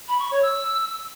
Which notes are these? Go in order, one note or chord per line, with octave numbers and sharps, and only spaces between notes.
B5
C#6
C#5
E6